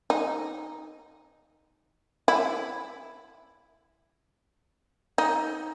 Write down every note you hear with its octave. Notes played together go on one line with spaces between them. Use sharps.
D#4
E4
D#4